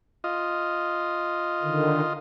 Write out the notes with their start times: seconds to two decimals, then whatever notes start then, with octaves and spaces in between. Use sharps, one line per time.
0.24 F4 D#5
1.62 D3 D#3